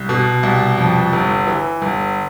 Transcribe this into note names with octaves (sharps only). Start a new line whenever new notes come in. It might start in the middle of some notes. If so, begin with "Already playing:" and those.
Already playing: C2
B2
C2
F2
G1
E3
G1